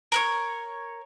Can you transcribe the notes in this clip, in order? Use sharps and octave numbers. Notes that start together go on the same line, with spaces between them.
A#4 B4 C#5